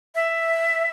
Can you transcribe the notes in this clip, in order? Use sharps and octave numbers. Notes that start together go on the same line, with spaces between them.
E5